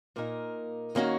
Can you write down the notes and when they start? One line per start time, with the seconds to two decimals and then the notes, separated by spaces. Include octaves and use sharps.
0.16 A#2 A#3 D#4 A#4
0.95 D#3 A#3 C#4 F#4 A#4